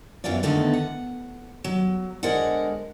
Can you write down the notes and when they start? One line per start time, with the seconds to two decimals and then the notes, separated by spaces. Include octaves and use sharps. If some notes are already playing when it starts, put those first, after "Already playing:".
0.24 F#2 E3 B3 F4 D5
0.43 E2 D3 D#3 A3 B3
0.73 F#5
1.64 F#3
2.23 D3 G#3 A#4 C5 D5 F#5